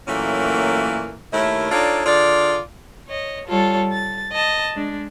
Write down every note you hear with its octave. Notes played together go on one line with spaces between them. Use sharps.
A#2 E3 F#3 A3 A#3 C#4
D#2 A3 E4 A#4 C#5 E5
D4 D#4 F4 A4 C#5 D5
D3 F4 G#4 D5
C#5 D#5
G3 F4 A4 C#5
A6
D#5 A5
G#3 D4